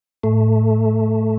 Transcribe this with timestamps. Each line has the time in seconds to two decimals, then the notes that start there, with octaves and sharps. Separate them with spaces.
0.23 A2 A3